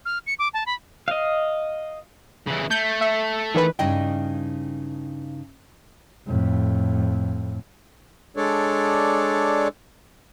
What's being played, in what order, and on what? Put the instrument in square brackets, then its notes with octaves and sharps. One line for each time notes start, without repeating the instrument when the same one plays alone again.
[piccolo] F6
C#7
D6
A5
B5
[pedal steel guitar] D#5 F5
[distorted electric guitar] C#3 E3
[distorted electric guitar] A3 [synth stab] G6
[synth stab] E5
D#3 E3 B4
[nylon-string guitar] G2 C#3 D#4 E4 D#5 G5
[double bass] F2 A2
[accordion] G#3 D4 A4 C#5 D5